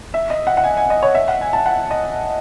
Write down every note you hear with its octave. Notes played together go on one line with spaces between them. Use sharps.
E5
D#5
F#5
F#5
G#5
G#5
D#5
C#5
E5
F#5
G#5
A5
F#5
D#5